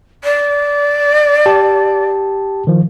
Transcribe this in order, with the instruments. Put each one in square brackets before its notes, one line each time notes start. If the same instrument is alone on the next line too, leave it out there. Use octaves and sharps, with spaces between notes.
[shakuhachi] D5
[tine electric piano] G4 A5
D#3 F3